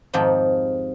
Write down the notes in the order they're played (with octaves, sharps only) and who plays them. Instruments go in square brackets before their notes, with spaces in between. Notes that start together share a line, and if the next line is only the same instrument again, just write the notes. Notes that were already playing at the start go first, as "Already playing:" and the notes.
[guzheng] F2 G#2 D#3 F3 G4